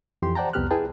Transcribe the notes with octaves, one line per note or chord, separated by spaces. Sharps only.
F2 E3 G4 C6
C5 D5 F#5 G5 A5 A#5
C2 F2 B3 G4 F6 F#6
E4 G#4 B4 G5 A5